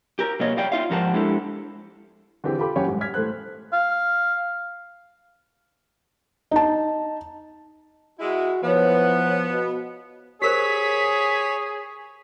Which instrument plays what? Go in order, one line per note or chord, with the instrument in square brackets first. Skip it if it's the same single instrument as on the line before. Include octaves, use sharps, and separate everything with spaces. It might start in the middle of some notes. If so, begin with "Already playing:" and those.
[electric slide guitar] G4 A#4
B2 F#3 A#3 C#5 D#5
G4 C#5 D5 F5 G5
D#4 F4 E5 F5
G#2 F3 G4 A#4 F#5 A5
G#3 D4 E4 G4 A4
[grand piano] D3 E3 C4 G4 G#4 C5
F4 G4 A4 B5 D6
F#1 C#4 G4 C#5 F#5 G#5
C2 G#2
F6 G#6 B6
A2 A4 C5 F#6
[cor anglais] F5
[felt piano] D#4 A5
[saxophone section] G#3 E4 [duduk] F#4
[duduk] F3 [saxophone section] B3 [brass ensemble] E4 B4 C#5
[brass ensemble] B2
[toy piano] G4 A#4 C5 [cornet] G#4 [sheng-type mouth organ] C#5 [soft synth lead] B6